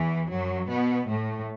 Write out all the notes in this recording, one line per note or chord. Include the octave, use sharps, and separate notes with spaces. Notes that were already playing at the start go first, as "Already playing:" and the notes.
Already playing: E2 E3
F#2 F#3
B2 B3
A2 A3